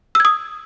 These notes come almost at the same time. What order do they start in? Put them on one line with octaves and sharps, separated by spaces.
E6 G#6 D#6